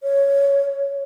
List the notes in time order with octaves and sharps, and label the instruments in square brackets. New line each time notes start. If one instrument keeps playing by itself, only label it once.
[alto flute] C#5